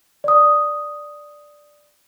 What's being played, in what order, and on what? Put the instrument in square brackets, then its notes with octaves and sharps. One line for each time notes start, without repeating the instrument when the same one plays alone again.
[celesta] D5 D#6